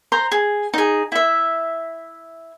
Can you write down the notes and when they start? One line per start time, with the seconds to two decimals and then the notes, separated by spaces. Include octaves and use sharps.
0.12 C5 A#5 C6
0.32 G#4
0.74 D#4 G#4
1.12 E4 E5